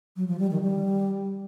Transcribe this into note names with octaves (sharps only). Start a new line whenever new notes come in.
F#3
F3
G3
D#3
G3